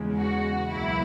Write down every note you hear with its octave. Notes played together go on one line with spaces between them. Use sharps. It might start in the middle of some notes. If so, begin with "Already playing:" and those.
Already playing: E2 C#3 G#3
F#4
C#2 B2 F#3 A#3 E4